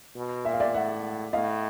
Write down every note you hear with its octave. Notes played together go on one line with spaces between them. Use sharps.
B2
A#2 E5
F5
D5 E5
A2 E5 F#5
A2 D#5 F5